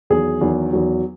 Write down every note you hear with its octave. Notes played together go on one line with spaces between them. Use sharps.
E2 D#3 F#3 G#4
E2 D#3 F#3
E2 D#3 F#3